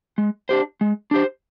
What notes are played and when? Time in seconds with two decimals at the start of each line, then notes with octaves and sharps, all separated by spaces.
0.18 G#3
0.49 D4 G4 C5
0.81 G#3
1.11 D4 G4 C5